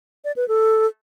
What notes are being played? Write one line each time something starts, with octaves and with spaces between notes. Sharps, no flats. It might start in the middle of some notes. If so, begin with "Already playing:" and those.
D5
B4
A4